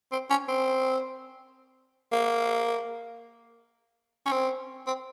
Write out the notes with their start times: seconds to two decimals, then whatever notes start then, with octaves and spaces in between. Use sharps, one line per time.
0.12 C4
0.30 C#4
0.48 C4
2.12 A#3
4.26 C#4
4.32 C4
4.86 C4